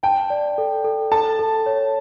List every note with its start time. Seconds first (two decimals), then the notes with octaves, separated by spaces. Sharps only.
0.03 G5 A5
0.30 D5
0.58 A4
0.85 A4
1.12 A4 A5
1.39 A4
1.66 C#5